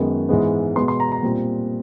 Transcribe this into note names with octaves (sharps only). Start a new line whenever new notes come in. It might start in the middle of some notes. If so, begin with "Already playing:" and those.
Already playing: F#2 D#3 G#3 B3
G#2 E3 G#3 B3
B2 G#3 B3 C6
C6
A#5
A#5
A#2 G3 C4